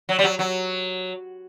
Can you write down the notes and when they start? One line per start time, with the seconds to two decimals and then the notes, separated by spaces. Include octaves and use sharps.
0.09 F#3
0.19 G3
0.24 F#3
0.39 F#3